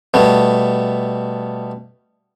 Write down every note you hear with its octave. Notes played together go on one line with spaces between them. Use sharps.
B2 G3 A3 B3